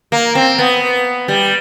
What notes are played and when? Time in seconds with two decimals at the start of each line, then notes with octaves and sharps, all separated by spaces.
0.12 A#3
0.35 C4
0.59 B3
1.28 G3